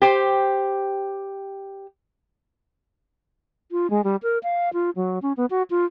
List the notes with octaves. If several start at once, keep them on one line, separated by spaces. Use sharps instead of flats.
G4 C5
F4
G#3
G3
A#4
F5
F4
F#3
C#4
B3
F#4
F4